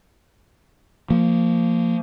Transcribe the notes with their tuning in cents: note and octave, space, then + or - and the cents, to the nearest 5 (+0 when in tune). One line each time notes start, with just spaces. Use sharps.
F3 -5 A#3 -20